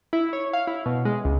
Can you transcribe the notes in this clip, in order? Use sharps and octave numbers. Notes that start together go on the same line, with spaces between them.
E4
C#5
F5
E4
B2
G#3
C#2